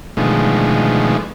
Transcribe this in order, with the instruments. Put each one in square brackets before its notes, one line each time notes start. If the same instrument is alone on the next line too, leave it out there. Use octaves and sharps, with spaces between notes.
[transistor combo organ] B2 D3 D#3 F3 G#3 A3